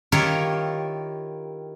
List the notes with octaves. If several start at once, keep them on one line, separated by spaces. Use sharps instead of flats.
D#3 E4 F4 G4 A#4 C#5